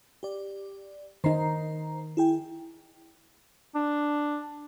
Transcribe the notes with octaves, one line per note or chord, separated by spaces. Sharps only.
G4 D5
D#3 D#4 C5 A#5 C7
E4 G#4 G5
D4